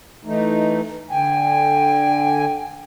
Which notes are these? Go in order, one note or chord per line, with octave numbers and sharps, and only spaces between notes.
E3 A3 D#4
D3 G5 G#5